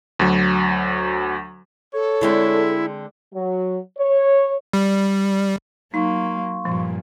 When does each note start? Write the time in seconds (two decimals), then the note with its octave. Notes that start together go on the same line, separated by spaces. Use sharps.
0.19 D2 F#3
1.93 A4 C#5
2.21 D3 G#3 C4 E4
3.33 F#3
3.98 C#5
4.73 G3
5.94 F#3 A#3 D#4 F5 C6 C#6
6.65 G2 A#2 F3